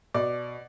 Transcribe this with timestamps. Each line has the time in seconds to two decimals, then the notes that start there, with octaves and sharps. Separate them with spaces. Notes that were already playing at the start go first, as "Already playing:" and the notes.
0.14 B2 D5